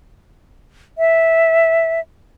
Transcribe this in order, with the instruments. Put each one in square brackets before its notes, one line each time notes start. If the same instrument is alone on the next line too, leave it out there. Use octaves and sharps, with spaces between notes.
[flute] E5